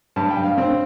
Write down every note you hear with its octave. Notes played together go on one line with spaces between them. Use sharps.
G2 A5
G5
G2
F5
C4